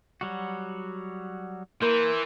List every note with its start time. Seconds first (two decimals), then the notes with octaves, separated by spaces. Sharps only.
0.21 F#3 G3 F#4
1.82 E3 A#3 A#4 C6 G6